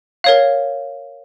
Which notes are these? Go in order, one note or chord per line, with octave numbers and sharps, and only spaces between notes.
A#4 C#5 F5